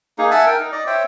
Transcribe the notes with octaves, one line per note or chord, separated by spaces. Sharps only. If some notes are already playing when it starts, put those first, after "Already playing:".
A#3 D#4 G#4
E5 F#5 G#5 A5
A#4 G5
D#4
D5 D#5
C5 C#5 E5 G5